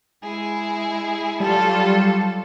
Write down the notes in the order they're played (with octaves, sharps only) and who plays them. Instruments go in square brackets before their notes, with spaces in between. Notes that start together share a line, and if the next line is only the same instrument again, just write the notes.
[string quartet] G#3 E4 G#4
[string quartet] F#3 F4 A4 [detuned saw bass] G3